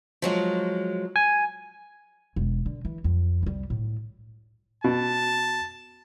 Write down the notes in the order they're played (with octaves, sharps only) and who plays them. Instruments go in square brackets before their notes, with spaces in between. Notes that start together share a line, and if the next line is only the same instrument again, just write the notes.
[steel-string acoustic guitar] F3 F#3 G#3
[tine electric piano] G#5
[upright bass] E1
D3
E3
F2
C2 G3
A2
[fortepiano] B2 [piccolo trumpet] A5